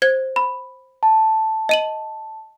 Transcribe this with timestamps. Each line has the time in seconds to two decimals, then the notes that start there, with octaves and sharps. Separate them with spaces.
0.02 C5 G#6
0.36 B5
1.03 A5
1.69 D#5 D#7 F#7